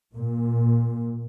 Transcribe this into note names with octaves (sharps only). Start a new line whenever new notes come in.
A#2